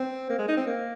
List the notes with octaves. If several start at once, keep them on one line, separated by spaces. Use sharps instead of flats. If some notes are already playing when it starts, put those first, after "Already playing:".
Already playing: C4
A#3
G#3
D#4
C4
A#3